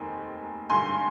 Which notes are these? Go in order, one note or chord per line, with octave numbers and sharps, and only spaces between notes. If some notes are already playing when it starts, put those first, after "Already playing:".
Already playing: F1 D#2 D#3 G#3 C4 G#5
G#1 G2 D3 G#5 C6